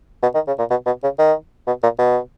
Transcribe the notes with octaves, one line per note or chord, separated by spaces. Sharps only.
B2
D#3
C#3
A#2
B2
B2
C#3
D#3
B2
A#2
B2